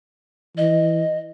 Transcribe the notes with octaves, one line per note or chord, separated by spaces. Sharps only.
E3 D#5